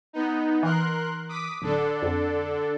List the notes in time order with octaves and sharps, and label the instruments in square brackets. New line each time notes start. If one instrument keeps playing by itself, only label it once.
[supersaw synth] B3 D#4
[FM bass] E3 [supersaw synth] A#4 C6 F#6
[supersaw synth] D6 D#6 B6
[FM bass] D1 [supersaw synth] D3 D4 A4
[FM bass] F2